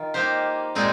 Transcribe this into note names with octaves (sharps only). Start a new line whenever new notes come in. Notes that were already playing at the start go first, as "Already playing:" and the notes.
Already playing: D#3 F4
A#3 D#4 G4 C5
A#2 G#3 C4 D#4